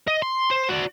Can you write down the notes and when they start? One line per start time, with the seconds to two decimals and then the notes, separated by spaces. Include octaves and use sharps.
0.08 D#5
0.22 C6
0.51 C5
0.69 F#4 D5